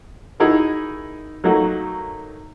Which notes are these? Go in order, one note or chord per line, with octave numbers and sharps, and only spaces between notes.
D#4 E4 F#4 G#4 A#4
F#3 A3 A#3 D#4 F#4